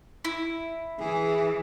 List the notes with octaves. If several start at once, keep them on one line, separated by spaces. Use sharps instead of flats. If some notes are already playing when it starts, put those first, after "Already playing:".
E4
E3 G#4